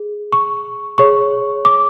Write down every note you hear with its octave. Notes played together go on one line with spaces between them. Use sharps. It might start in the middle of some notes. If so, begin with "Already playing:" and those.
Already playing: G#4
C#6
G#4 C#5 C#6
D6